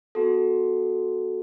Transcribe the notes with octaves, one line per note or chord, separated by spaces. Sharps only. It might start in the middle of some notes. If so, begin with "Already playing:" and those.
B3 F#4 A4